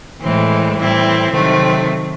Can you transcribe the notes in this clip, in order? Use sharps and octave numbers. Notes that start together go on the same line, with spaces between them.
A2 E3 G#3 C4
A2 E3 G3 C4 E4
C3 D#3 F#3 A3 C4